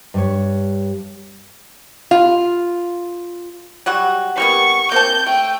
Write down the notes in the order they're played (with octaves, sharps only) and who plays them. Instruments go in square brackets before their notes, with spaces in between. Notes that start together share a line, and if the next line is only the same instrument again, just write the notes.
[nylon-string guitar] G2 G3 C#5
[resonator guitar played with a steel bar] F4
[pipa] F#3 G3 F#4
[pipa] G3 A#3 B3 [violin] C#6
[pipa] A#3 C4 A5 [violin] G6
[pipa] A3 [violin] G5